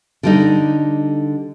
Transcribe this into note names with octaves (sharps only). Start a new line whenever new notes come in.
D3 G3 D#4